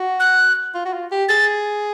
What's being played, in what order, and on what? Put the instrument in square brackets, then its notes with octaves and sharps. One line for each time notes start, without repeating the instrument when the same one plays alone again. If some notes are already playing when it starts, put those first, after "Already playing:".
Already playing: [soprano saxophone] F#4
[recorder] F#6
[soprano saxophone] F4
F#4
F4
G4
[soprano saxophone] G#4 [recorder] A6